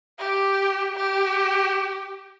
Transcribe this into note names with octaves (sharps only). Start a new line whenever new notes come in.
G4
G4